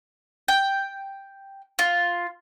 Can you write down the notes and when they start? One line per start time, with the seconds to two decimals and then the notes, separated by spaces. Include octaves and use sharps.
0.48 G5
1.79 F4